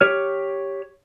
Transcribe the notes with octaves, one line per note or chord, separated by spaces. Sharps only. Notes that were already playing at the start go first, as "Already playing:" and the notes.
G4 C#5 F6